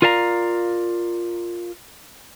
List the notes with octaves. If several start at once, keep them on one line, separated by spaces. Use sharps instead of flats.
F4 A#4 D5 F5 A5 A#5